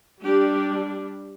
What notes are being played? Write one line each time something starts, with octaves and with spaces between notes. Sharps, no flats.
G3 D4 G4